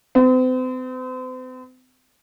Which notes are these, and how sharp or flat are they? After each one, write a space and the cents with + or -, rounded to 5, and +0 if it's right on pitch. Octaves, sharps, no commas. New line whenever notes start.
C4 -40